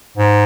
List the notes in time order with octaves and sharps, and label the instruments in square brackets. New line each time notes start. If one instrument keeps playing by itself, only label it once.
[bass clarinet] G#2